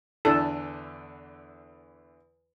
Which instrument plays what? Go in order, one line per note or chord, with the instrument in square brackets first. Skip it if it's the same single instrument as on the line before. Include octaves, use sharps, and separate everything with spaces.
[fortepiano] E2 D3 E3 [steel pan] A4